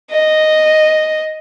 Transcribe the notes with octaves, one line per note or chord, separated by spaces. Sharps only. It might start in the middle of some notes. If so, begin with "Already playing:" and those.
D#5